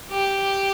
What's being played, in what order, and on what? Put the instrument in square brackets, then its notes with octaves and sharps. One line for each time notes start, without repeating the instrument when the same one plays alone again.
[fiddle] G4